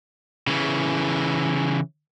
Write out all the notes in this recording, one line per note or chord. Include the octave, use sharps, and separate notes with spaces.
C#3 E3